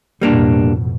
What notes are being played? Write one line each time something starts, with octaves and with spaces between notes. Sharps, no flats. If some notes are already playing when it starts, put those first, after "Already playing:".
A1 F2 B2 G3 A#3 D4